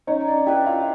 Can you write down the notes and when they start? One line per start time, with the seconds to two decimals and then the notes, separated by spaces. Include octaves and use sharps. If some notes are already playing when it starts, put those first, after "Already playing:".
0.07 C#4 D#4 C#5
0.27 D4 D5
0.46 E4 G4 B4 E5
0.66 F4 F5